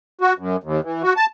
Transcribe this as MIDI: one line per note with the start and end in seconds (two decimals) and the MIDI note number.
0.21 0.33 66
0.38 0.56 42
0.64 0.81 39
0.84 1.03 52
1.03 1.13 66
1.17 1.26 81